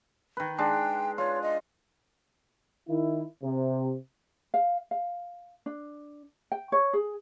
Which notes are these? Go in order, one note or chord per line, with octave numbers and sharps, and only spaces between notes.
D#3 B4
G#3 D4 G5
F4 C#5
D#5
D#3 E4
C3
F5
F5
D4
G5
C#5
G#4